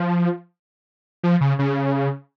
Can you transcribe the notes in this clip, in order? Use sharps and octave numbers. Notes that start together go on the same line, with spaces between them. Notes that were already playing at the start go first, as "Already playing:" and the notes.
Already playing: F3
F3
C#3
C#3